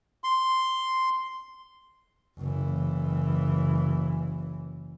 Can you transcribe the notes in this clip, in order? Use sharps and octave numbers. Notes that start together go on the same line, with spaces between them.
C6
F#1 E3